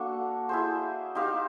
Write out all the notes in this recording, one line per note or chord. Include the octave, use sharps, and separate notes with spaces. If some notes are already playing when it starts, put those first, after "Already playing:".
Already playing: A#3 D4 F#4 A4
E4 G#4 C5
D#4 G4 C5 F5